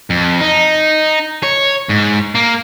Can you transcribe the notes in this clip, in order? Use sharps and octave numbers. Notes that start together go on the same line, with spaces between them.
F2
D#4
C#5
G#2
A#3